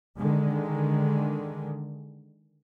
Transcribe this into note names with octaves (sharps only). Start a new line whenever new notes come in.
D3 D#3 G#3